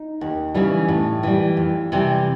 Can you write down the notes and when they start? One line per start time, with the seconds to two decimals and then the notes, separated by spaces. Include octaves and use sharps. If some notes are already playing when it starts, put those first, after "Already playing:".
Already playing: D#4
0.21 D#2
0.54 C#3 E3 G3
0.88 A2
1.23 E3 G3
1.57 F2
1.92 C3 E3 G3